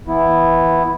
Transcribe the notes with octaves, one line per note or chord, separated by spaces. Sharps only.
E3 B3 E4